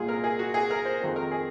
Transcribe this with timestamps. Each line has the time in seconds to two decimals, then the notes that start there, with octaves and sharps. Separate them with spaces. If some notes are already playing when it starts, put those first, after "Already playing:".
Already playing: C2 A#2 G#3 F4 G#4
0.08 A#4
0.24 G#4
0.39 F#4
0.54 G#4
0.70 A#4
0.85 C5
1.00 F2 D#3 G#3 C4
1.16 A#4
1.31 G#4